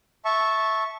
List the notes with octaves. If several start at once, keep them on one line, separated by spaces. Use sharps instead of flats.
E5 A5 C#6